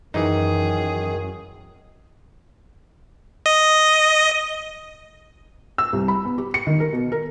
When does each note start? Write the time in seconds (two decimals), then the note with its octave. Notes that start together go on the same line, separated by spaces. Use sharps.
0.14 F#2 D#3 E3 D#4 G#4
3.46 D#5
5.78 E6
5.93 C2
6.08 B5
6.25 B3
6.38 G4
6.54 C#7
6.67 D#3
6.80 A#4
6.93 B2
7.12 A#4